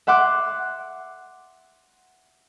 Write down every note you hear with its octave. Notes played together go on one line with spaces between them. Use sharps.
E5 F#5 C6 D6 F#6